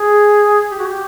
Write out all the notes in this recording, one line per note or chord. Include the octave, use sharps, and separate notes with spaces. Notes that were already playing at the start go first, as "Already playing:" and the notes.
Already playing: G#4
G4
F#4
G4